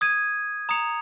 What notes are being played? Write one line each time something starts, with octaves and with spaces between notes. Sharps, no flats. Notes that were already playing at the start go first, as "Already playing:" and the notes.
D#6 G#6 D#7
A#5 D#6 C#7 F7